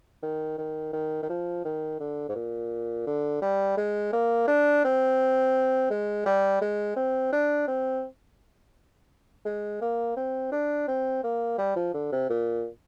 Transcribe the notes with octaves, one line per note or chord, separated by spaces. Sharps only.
D#3
D#3
D#3
D#3
F3
D#3
D3
G#2
A#2
D3
G3
G#3
A#3
D4
C4
G#3
G3
G#3
C4
D4
C4
G#3
A#3
C4
D4
C4
A#3
G3
F3
D3
C3
A#2